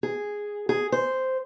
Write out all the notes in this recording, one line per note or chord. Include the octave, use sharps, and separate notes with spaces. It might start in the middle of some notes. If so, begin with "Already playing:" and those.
G#4
G#4
C5